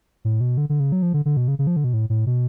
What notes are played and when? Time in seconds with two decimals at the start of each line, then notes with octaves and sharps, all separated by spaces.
0.25 A2
0.41 B2
0.57 D3
0.69 D3
0.80 C#3
0.92 F#3
1.02 F3
1.14 D3
1.26 D3
1.37 B2
1.48 C#3
1.59 C#3
1.67 F3
1.76 D3
1.84 B2
1.94 A2
2.10 A2
2.27 B2